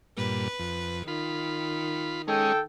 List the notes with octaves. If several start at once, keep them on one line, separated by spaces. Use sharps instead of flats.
G2 A#2 B4
F2
D#3 F4 B5
G#3 C#4 D#4 A4 G5